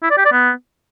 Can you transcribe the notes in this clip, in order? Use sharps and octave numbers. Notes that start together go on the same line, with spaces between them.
E4
D5
G4
D5
B3